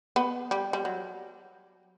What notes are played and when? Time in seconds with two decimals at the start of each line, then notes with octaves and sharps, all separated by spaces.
0.16 B3
0.51 G3
0.73 G3
0.85 F#3